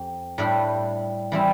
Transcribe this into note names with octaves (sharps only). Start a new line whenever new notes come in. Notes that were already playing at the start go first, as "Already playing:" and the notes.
Already playing: F2 G4
A2 G3 D4 G4
E3 G3 C4